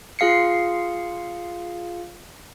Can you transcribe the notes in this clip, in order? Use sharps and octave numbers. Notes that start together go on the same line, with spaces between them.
F4 G#4 F5 C7 C#7